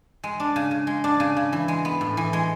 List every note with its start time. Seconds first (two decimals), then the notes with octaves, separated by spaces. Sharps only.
0.24 G#3
0.40 D4
0.56 C#3
0.71 C#3
0.87 G#3
1.04 D4
1.20 C#3
1.37 C#3
1.53 E3
1.68 G#3
1.85 B3
2.01 A2
2.17 E3
2.33 G#3